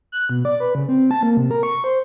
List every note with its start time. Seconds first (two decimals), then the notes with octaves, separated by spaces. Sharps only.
0.12 F#6
0.29 B2
0.45 D5
0.60 B4
0.75 C#3
0.89 C4
1.11 A5
1.23 A#3
1.37 C3
1.51 A#4
1.63 C#6
1.84 C5